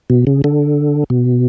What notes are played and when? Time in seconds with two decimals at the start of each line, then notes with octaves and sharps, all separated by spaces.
0.10 B2
0.27 C#3
0.44 D3
1.10 B2